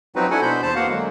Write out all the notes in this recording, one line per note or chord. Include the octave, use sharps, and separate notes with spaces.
F3 F#3 C4 D#4 F#4 B4
D4 E4 F#4 A4 F#5 G#5
B2 B3 D4 C5 B5 G6
E2 C5 A5
A#3 B3 F#4 F5 F#5
D3 F#3 G#3 A#3